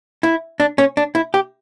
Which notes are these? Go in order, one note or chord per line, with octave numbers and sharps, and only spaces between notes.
E4
D4
C#4
D4
E4
G4